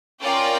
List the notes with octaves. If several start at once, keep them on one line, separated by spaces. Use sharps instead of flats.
C#4 F4 A#4 D5 G5